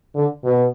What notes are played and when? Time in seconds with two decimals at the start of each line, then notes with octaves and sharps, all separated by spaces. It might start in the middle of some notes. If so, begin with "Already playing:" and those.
0.15 D3
0.44 B2